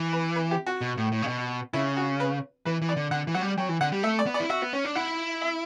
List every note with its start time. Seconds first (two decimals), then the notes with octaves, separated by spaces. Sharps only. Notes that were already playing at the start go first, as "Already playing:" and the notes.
Already playing: E3
0.13 B4
0.36 B4
0.51 G4
0.66 F#4
0.81 B2
0.97 A2
1.12 A2
1.22 C#3
1.27 B2
1.73 C#3 E4
1.97 F#4
2.20 B4
2.65 E3 B4
2.82 E3
2.89 D5
2.97 D3
3.11 D3 F#5
3.27 E3
3.35 F#3 F#5
3.42 G3
3.58 F#3 G5
3.69 E3
3.81 D3 F#5
3.92 G3
4.03 A3 E5
4.19 D5
4.26 B3
4.34 D5
4.40 E4
4.50 F#4 E5
4.62 B3
4.73 C#4
4.85 D4
4.95 E4 F#5
5.42 E5